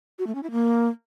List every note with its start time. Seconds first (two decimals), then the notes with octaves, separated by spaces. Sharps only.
0.19 F#4
0.27 A3
0.35 C#4
0.43 E4
0.51 A#3